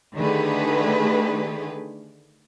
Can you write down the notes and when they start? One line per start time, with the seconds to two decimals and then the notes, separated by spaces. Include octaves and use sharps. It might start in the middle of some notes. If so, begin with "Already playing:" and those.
0.14 D3 D#3 A3 G4 G#4 B4